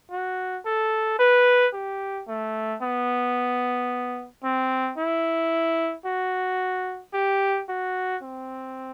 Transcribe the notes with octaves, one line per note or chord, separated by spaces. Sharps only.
F#4
A4
B4
G4
A3
B3
C4
E4
F#4
G4
F#4
C4